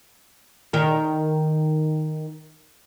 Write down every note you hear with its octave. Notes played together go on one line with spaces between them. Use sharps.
D#3 A#4